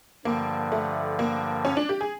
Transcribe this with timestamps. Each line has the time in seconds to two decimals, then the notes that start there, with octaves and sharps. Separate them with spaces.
0.25 G2 D3 F3 A#3
0.72 A3
1.19 A#3
1.65 C#4
1.77 D4
1.89 G4
2.01 G#4